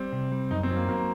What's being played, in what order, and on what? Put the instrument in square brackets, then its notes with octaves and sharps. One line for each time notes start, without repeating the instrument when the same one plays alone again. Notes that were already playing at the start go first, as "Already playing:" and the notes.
Already playing: [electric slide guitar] G3 [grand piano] C4
[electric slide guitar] C3
G3
[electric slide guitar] F#2 [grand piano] D#4
[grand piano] C4
[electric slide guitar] F#3
[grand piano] A#3
[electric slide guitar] F#3 [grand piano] A#3